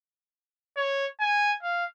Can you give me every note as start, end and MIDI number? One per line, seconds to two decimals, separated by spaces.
0.77 1.06 73
1.20 1.53 80
1.63 1.85 77